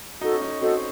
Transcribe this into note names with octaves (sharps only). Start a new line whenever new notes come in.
D#4 F#4 A4 D#5
C#4
D#4
C#4
C4 F#4 A4 D#5